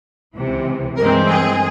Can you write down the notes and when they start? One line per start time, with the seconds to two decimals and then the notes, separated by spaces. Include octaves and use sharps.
0.35 C#2 C3 E3
0.97 G2 E3 G#3 C4 A#4
1.29 G#4